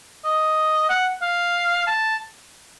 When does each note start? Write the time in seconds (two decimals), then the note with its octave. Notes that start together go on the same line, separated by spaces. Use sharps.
0.25 D#5
0.89 F#5
1.22 F5
1.87 A5